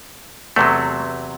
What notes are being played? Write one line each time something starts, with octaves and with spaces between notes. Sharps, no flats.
E2 C3 F#3 A3